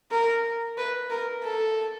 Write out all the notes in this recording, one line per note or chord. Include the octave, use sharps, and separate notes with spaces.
A#4
B4
A#4
A4